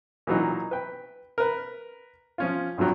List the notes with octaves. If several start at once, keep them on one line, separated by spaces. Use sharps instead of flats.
A#2 E3 F#3 D#4
B4 G5
A#4 B4
F3 C#4 F4
G#1 G2 F3 F#3